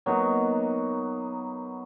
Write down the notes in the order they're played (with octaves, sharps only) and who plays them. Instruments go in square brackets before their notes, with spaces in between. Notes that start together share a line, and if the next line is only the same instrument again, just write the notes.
[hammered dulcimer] F#3 A#3 B3 D#4